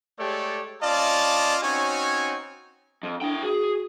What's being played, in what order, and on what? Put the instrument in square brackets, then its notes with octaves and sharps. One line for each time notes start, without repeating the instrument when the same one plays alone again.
[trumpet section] G#3 A3 G4 A4 C#5 D5
C#4 F4 D5 D#5 F5 A5
C4 C#4 D#4 F#4 C#5 G#5
[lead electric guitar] F2
[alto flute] D4 [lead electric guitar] E4 G5
[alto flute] F#4 [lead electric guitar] G#4